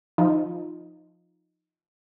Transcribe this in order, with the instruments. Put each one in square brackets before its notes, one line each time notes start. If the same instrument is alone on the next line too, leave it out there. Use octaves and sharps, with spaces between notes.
[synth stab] F3 D#4